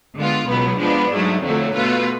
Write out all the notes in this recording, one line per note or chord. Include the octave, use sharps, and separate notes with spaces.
D3 G#3 B3 F4
C#2 B2 F#3 B3
F3 G#3 B3 D4
G#2 F#3 A3
F2 D3 F#3 A3
B2 A3 F4 B4